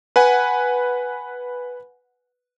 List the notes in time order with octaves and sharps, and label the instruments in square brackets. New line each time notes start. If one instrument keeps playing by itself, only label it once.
[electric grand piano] B4 F#5 G#5